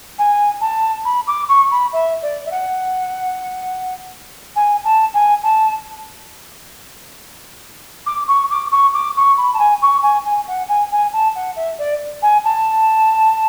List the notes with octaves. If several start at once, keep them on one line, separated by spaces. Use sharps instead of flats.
G#5
A5
B5
D6
C#6
B5
E5
D5
E5
F#5
G#5
A5
G#5
A5
D6
C#6
D6
C#6
D6
C#6
B5
A5
G#5
C#6
G#5
G#5
F#5
G#5
G#5
A5
F#5
E5
D5
G#5
A5